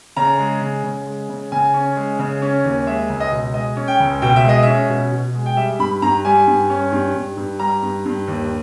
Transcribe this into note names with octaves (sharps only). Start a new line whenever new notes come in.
C#3 A#5
G#3
C#3
C#3
G#3
C#3
C#3 G#5
C#4
G#3
C#3
C#4
D#2
G#3 E5
C#2
D#5
B2
G#3 D#5
C#4
G5
C#2
B2 G5
E5
G#3 D#5
C#4 E5
B2
B2
G#3
G5
G3 E5
G2 B5
G2 A#5
G3 G#5
G2
C#4
G2
G2
G2
G3 A#5
G2
G2
D#2